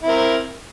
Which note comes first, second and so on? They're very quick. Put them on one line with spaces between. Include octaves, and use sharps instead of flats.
E4 C4 A#4